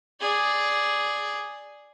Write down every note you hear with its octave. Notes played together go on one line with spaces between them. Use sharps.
G#4 D5